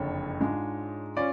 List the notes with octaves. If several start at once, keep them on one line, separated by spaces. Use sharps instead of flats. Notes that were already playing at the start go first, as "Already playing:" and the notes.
Already playing: F#1 F2 D3 C#5
G#2 G#3 D4 F4
C#4 F4 D5